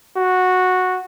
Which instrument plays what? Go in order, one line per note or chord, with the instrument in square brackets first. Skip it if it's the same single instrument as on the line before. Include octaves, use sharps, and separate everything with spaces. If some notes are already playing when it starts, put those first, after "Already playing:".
[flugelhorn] F#4